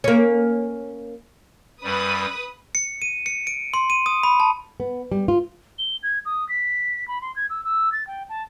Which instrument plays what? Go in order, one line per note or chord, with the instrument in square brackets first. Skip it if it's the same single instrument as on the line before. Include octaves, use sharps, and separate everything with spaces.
[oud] A#3 C#4
[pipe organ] F#2 G3 [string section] B4 D#6
[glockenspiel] C#7
D#7
C#7
D7
C6
D#7
D#6
B5
A5
[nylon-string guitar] B3
G3
F4
[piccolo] G7
G#6
D#6
B6
B5
C6
G#6
E6
E6
A6
G5
A5